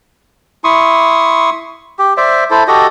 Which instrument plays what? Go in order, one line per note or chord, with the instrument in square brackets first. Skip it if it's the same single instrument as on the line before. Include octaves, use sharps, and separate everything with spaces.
[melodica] E4 C6 C#6 D#6
G4
C5 D5 E5
E4 A4 C5
F#4 G4 A4 D#5